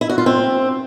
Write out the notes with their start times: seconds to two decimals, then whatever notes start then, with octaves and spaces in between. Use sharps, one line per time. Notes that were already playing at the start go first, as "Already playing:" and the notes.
0.01 E4
0.10 F#4
0.18 F4
0.26 C4